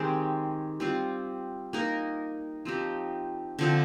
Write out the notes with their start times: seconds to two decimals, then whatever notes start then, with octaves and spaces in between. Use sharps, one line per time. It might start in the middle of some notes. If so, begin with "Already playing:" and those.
Already playing: D#3 G#3 C4 G4
0.80 G3 C4 F4
1.73 A#3 D#4 A#4
2.65 F3 C4 D#4 G4
3.59 D3 F3 C4